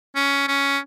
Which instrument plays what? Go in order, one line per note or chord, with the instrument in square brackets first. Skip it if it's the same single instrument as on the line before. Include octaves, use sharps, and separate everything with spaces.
[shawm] C#4
C#4